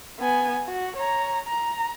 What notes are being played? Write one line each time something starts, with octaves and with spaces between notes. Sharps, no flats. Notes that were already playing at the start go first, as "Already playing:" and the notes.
B3 G#5
F#4
C#5 A#5
A#5